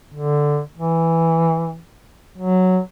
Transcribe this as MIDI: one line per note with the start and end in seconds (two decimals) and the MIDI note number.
0.14 0.60 50
0.76 1.78 52
2.38 2.79 54